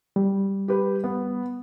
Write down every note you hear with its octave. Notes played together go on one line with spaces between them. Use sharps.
G3
G4 B4
B3